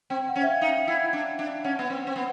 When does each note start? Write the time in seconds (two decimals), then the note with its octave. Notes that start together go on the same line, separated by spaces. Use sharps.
0.10 C4 G5
0.29 F#5
0.36 C#4
0.43 E5
0.49 F5
0.61 D#4
0.88 E4
1.13 D4
1.39 D4
1.64 C#4 F#5
1.79 B3
1.90 C4
2.07 C4
2.16 B3